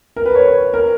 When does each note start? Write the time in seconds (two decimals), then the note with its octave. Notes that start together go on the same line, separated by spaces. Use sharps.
0.16 A#4
0.26 B4
0.35 C#5
0.74 A#4